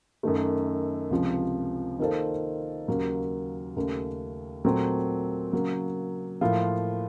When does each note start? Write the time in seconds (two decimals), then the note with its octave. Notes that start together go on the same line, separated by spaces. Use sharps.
0.23 F#2 D#3 A3
1.11 C#2 C3 F3
1.99 D#3 A#3 F4 A4 C5
2.88 D#2 C#3 F#3 A#3
3.76 D#2 C#3 A3 C#4
4.64 A#2 F#3 A3 C4
5.53 C#3 F#3 A#3
6.41 A2 F3 A#3 F4